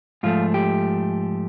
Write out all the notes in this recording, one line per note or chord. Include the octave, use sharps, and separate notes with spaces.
G#2 F3 A3 F4
G4